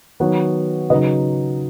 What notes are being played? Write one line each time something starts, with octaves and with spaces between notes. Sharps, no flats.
D#3 F#3 B3 C#5 F#5
C#3 F#3 D#4 B4 D#5